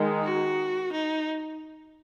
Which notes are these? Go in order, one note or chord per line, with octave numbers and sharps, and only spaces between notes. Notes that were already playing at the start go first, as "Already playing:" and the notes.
Already playing: D#3 G#3 D#4
F#4
D#4